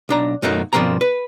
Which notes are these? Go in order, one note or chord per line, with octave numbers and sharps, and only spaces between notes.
B1 D4 A#5
B1 F#2 A3 A#3 D#4 F#4
G2 B2 F3 A#3 C4 A#5
B4